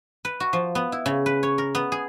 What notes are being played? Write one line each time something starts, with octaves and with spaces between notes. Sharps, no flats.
B4
F#4
F3
B3
E4
C#3
B4
C#5
A#4
B3
G#4